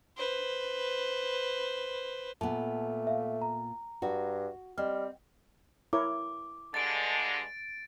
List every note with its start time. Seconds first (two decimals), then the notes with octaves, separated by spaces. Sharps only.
0.17 B4 C5
2.41 A#2 A3 B3 A5
3.07 E5 F5
3.42 A#5
4.02 G2 F#4
4.78 G3 C4 D#5 F6
5.93 E4 A#4 C#5 D6
6.74 G2 D3 G#3 A6 D7